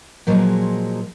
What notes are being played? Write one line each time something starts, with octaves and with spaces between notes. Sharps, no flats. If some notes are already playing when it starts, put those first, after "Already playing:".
A#2 F3 F#3 G#3